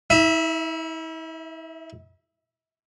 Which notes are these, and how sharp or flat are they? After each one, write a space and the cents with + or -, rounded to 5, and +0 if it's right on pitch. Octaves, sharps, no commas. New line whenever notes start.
E4 -40 E5 +5